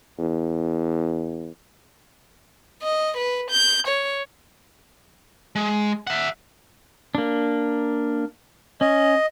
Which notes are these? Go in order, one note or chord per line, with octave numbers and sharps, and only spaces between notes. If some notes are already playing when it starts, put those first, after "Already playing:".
E2
D#5
B4
G6
C#5
G#3
E5 F#5
A#3 D4
C#4 D#5